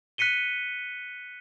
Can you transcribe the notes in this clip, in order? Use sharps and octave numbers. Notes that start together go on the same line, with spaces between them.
F#6 B6 C#7 D#7 G7